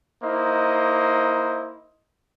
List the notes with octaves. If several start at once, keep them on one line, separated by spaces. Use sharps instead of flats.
A#3 D#4 E4 C5 D#5